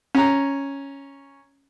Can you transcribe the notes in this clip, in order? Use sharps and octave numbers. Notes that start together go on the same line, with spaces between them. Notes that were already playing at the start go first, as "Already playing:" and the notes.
C#4 A#5